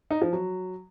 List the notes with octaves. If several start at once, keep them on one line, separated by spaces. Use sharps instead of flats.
D#4
F3
F#3